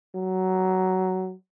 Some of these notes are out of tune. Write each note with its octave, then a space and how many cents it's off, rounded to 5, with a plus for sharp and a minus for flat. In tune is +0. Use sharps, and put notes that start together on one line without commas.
F#3 +15